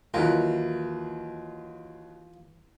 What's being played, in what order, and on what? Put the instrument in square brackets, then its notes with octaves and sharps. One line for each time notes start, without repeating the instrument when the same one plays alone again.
[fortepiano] D#2 F#3 [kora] E3 A#4 [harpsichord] F4